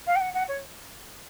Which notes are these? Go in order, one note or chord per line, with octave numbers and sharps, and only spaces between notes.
F5
G5
F#5
F#5
C#5